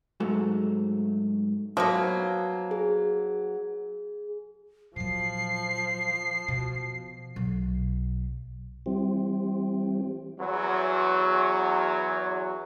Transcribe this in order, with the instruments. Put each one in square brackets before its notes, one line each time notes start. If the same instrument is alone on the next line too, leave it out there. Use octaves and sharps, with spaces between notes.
[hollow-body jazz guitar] G#2 F#3 A3
[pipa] F3 A#3 [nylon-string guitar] F#3 B3
[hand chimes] G#4
[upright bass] A#2 F#3 [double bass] F3 [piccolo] C7
[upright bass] B2
B1
[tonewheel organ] E3 G3 C4
[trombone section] E2 F#3